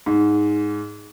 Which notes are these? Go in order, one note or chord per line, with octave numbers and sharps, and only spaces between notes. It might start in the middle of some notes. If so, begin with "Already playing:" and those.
G#2